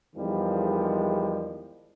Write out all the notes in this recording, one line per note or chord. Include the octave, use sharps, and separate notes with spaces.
E2 D#3 F3 G3 G#3